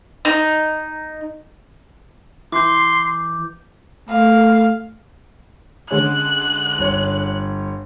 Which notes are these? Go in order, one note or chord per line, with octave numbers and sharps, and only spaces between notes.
D#4
E3 C6 D6 G6
A3 F5
D3 G#3 C#4 F#6
G1 C#5